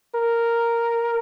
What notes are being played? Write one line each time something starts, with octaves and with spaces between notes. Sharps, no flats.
A#4